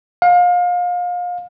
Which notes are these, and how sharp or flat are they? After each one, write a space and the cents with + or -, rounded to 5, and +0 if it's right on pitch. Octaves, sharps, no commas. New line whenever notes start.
F5 +30